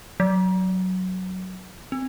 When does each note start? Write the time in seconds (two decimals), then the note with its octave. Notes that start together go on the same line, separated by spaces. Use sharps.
0.20 F#3
1.92 C4